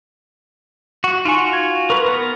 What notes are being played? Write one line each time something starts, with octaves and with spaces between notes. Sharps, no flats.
F#4
D#4 F4 F#4 G#5 C#6
G#6
A#4 B4 C#6
B3 A#4